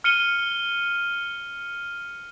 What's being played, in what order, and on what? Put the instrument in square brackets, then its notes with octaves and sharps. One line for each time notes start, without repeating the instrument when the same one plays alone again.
[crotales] F6 C#7 D#7 G7